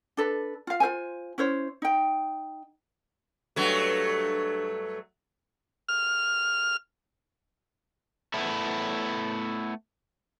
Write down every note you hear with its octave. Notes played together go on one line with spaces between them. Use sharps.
D4 A4 B4
F4 F5
F4 A#4 C5 G#5
C#4 E4 C5 C#5
D#4 G5
G2 F#3 A3
F6
A3 B3 E4